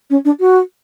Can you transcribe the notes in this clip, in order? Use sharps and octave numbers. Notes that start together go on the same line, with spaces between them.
C#4
D4
F#4